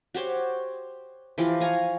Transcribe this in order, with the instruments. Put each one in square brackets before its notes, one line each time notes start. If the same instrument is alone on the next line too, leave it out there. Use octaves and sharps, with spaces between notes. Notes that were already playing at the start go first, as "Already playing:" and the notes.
[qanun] F#4 G4 C5 C#5
E3 F3 F4 G4
F5 G#5 A#5 C#6